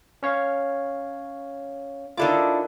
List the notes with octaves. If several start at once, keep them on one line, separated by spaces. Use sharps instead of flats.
C#4 C#5 F5
D#3 D4 E4 F4 A4 D6